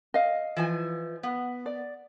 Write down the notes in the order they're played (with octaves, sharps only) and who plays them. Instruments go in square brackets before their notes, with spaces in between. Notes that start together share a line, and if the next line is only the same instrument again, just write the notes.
[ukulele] D#5 F5
[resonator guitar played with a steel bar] E3 F3 G#5
B3
[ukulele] D5